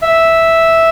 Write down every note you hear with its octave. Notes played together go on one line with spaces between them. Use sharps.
E5